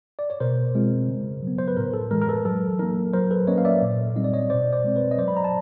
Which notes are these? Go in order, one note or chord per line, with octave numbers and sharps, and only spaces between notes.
D5
C#5
B2 A#4 C5
G#3 C4 F4
C#3
F#3 B3
C5
B4
A2 A#4
A4
E3 G#3 A#4
A#4
A4 B4
F#3 A4
A#3 D#4 A#4
F#3 A#4 C5
A4 B4
A#3 C#4 C#5 D#5
F5
D5 E5
A#2
G3 C4 D#4 D#5
D5
C#5 D#5
B2 C5 D5
C5 D5
G#3 C4
B4 C#5
D#5
F#3 C5 D5
B5
A#5
A5